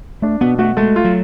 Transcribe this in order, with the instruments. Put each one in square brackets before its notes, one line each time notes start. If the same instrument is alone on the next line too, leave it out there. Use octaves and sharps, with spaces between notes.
[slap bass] A3 [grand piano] D4
[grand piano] B2 [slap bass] B3
[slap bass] A3 [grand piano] F#4
[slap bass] G#3 [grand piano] A3
[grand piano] F4
[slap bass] F#3